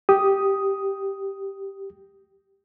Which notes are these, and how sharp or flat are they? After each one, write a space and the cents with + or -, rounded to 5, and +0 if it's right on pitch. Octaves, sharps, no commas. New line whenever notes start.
G4 +0 D#6 +0